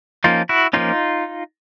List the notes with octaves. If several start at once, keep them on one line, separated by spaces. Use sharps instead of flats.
F3 A#3 C#4 D#4 F4
E4 F#4
F3 A#3 C#4 D#4 F4